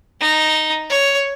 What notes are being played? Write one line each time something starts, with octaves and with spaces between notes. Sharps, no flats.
D#4
C#5